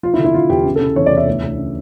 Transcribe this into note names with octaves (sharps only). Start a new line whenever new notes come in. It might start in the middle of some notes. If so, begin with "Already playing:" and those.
F3 F4
E4
D3
E4
D3 F4
E2 G4
C#3
A4
C#3
E3 C#5
D5
E2
E5
D2
D2
C#3